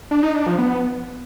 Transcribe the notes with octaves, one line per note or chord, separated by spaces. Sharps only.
D4
D#4
D4
F3
B3